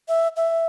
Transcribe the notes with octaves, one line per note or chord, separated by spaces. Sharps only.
E5
E5